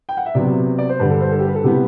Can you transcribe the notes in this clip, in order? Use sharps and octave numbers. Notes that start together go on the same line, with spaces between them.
G5
F#5
E5
C3 F#3 B3 D5
D5
C5
G2 D3 G3 B4
A4
C5
A4
G4
B4
A4
C3 G3 B3 E4 G4